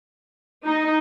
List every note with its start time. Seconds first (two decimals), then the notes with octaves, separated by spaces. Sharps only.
0.65 D#4